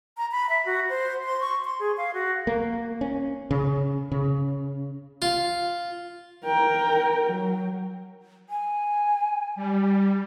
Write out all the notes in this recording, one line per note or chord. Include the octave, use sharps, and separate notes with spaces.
A#5
B5
E5
F#4
C5
C6
C#6
C6
G#4
F5
F#4
A#3
C#4
C#3
C#3
F4
A#4 G5
F#3
G#5
G3